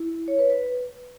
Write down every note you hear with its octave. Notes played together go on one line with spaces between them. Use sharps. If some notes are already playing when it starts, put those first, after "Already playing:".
Already playing: E4
C#5
B4
B4